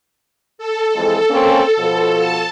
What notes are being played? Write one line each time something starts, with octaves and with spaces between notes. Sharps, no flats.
A4
F2 E3 G#3
A#3 C4 C#4
B2 F3
A5